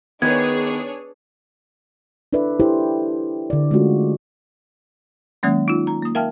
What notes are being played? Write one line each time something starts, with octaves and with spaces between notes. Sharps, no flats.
D#3 B3 D4 G#4 B4 C#5 G#6
D4 E4 A4 B4 D5 E5
E4 G4 A4 C5
D3 D5
G#3 A3 C#4 F4 F#4
D#3 F#3 G#3 A#3 C#4
D#4 F4
A#5
A#3 D#6
A#4 E5 F5 G5 A5 F6